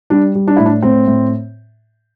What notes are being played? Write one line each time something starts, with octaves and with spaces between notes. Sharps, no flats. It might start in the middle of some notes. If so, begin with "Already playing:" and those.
G3 D4
G3
D4
A2 E4
D4
A2 C4
A2